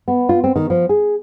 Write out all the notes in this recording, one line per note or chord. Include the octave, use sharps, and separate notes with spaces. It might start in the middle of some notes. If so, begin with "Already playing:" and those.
B3
F4
C4
D#3
F3
G#4